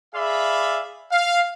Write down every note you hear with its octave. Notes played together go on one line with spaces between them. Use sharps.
G#4 D5 E5 F5 B5
F5